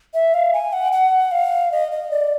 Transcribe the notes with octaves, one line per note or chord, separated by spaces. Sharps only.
E5
F5
G#5
F#5
F#5
F5
D#5
D#5
D5